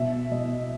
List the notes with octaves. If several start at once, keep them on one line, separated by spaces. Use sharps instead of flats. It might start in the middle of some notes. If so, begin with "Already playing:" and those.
Already playing: B2 E5
B2 D#5